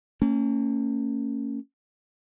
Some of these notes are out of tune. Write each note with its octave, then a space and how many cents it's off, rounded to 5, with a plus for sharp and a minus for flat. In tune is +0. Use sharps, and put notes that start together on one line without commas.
A#3 -45 C#4 +0